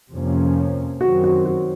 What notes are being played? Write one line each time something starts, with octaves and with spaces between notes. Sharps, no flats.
F2 C3 F3 A#3 C#4
F#2 D#3 F#3 C4 F#4
F#4
F#4